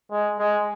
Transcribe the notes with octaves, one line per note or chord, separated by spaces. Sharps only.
G#3
G#3